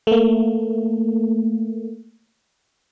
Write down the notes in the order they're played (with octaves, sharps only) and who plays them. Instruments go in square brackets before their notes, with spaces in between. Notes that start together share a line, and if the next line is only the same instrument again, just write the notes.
[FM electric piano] A3 A#3